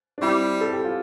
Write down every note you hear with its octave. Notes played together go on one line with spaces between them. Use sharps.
D4
G3 C4 E4
A4
G4
F4